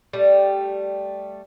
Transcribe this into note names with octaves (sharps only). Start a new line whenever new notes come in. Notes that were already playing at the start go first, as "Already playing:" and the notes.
G3 A3